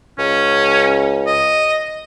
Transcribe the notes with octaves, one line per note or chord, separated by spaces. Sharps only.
C#2 C#4
D#5